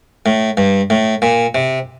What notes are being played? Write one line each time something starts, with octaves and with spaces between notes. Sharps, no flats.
A2
G2
A2
A#2
C3